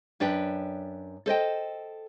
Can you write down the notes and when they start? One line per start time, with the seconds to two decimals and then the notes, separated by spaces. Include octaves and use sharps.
0.20 F#2 D4 B4 G5
1.26 A4 C5 D#5 G5